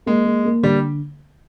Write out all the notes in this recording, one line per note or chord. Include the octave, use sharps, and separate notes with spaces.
G#3 A#3
A#3
A#3
D3 G3